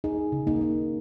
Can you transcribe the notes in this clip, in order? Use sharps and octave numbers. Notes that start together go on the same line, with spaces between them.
A#3 D#4 G#4
C#3
A#3 D#4
A#3